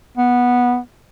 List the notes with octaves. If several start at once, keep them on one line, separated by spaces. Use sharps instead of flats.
B3